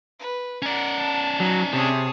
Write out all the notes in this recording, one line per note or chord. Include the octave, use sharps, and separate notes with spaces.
B4
C#4 A#4 D5 F#5
A5
F#3 D#4
C3 G#4 C#5 A5 D#6